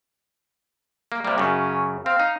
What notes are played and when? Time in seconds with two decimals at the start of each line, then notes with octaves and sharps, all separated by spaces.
1.12 A#3
1.25 C3 G3 A#3
1.38 F#2 C#3 C#4
2.06 C4 F5
2.20 D#4